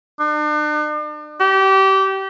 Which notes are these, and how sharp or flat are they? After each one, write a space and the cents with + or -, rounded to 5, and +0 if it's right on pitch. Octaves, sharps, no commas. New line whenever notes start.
D4 +40
G4 -25